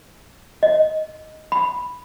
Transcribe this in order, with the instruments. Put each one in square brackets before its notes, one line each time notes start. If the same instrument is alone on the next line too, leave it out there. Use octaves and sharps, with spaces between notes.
[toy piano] D#5
B5